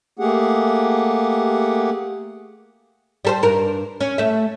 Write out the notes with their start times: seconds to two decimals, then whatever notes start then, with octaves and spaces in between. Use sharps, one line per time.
0.19 A3 A#3 G4 G#4 F#5
3.25 G3 A4 C5
3.43 G2 A#4
4.00 C#4
4.18 A3 E5